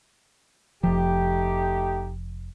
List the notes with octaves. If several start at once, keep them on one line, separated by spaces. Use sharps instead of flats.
F1 F3 A3 D#4 G4